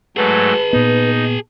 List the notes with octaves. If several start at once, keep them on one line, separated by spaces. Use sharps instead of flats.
G#2 F#3 A3 G#4 B4 A5
A#2 B3 D#4